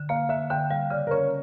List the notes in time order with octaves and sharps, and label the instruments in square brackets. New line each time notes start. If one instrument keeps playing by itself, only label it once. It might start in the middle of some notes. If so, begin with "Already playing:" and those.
Already playing: [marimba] D3
[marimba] A#3 [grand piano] F5
[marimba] D3 [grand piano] E5
[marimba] D3 [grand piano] G5
[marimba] G3 [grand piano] F5
[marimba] C#3 [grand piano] D5
[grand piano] A#4
[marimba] C#4 [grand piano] C#5